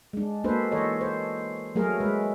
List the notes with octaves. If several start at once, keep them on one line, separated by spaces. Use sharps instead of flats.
G#3 D4
A#3 D4 F#4 A4 B4 C5
E3 A4 C#5 D#5
C5
F#3 A3 G#4 A#4
G#3 B4